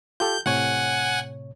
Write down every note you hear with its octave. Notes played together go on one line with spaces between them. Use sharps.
F4 G4 A4 G6
A2 C3 C#5 F#5 G#5